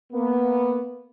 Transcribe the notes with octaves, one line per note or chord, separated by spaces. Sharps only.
A#3 B3